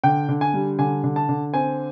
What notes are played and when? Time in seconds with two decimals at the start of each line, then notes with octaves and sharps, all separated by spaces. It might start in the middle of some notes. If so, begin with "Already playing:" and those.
0.04 D3 G5
0.29 D3
0.41 G#5
0.54 G3
0.79 D3 G#5
1.04 D3
1.16 A5
1.29 D3
1.54 C4 G#5